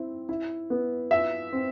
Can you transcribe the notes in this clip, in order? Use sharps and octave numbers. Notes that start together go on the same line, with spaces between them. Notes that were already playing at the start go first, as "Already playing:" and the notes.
Already playing: C4 E4
E4
B3
F4 E5
C4